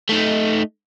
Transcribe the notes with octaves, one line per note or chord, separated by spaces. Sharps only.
A3 D#4